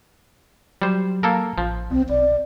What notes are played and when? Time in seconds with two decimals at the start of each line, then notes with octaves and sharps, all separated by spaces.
0.82 F#3 G3 C5
1.23 A#3 A4 A#4
1.58 A1 F3
1.91 C2 C4
2.09 B1 D5